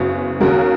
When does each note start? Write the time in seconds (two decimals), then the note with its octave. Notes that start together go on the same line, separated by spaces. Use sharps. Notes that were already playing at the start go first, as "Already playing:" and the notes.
Already playing: F#1 F#2 C#3 B3
0.40 D#2 C#3 G#3 F#4 A#4